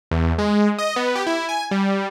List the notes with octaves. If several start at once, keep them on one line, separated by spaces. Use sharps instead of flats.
E2
G#3
D#5
B3
G4
E4
G#5
G3